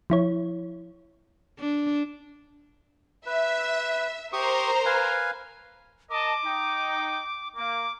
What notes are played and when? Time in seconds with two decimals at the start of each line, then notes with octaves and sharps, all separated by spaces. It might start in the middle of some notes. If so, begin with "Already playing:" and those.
0.10 F3 E4 C#5
1.59 D4
3.26 B4 E5
4.33 G4 A#4 C5 A#5 C#6 D#6
4.86 B4 F5 G#5
6.10 A#4 D#5 A5 D6
6.45 D#4 G5
7.56 A#3 D6